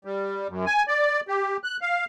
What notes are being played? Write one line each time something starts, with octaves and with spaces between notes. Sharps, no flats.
G3
F#2
G#5
D5
G4
F#6
F5